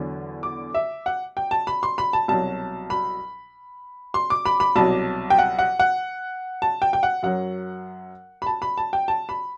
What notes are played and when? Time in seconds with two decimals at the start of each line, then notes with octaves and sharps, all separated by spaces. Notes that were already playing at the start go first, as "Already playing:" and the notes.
Already playing: E2 D3 F#3
0.43 D6
0.74 E5
1.06 F#5
1.37 G5
1.51 A5
1.67 B5
1.83 C6
1.98 B5
2.13 A5
2.28 C2 B2 F#3 A5
2.90 B5
4.14 C6
4.30 D6
4.46 B5
4.60 B5
4.76 C2 B2 F#3 A5
5.30 G5
5.38 F#5
5.59 F#5
5.79 F#5
6.62 A5
6.82 G5
6.93 G5
7.03 F#5
7.23 F#2 F#3 F#5
8.42 B5
8.46 A5
8.62 B5
8.78 A5
8.93 G5
9.08 A5
9.29 B5